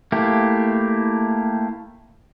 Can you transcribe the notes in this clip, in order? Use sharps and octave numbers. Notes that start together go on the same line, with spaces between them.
A3 A#3 E4 G4